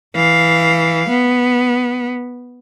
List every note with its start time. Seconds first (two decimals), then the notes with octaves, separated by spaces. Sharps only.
0.16 E3 F5
1.09 B3